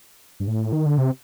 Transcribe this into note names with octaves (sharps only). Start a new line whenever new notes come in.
G2
A2
D#3
D3
C3